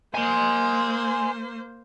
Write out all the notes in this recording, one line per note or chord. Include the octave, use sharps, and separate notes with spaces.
A#3 C5 G#5 C6